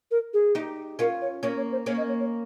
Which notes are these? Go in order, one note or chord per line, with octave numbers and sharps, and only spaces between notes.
A#4
G#4
D#4 G4
C#4 F4 A#4
C#5
A#3 C#4 C#5
C#5
C5
A#3 C#4 C#5
D#5
C#5
C#5